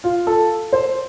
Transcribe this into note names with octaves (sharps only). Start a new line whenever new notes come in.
F4
A4
C5